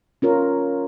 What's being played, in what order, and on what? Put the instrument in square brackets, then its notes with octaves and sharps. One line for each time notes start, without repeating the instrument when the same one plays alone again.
[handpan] C#4 F4 A#4 C#5